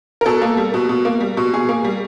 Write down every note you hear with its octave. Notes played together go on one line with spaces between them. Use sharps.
A#4
B2 A4
A#3
G3
B2
B2
A#3
G3
B2
B2 G#4
A#3
G3